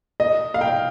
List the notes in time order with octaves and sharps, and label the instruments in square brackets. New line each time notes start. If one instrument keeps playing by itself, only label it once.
[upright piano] D#5
F5
G5